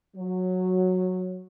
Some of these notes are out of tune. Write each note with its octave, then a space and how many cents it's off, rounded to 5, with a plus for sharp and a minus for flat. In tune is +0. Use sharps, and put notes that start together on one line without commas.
F#3 -10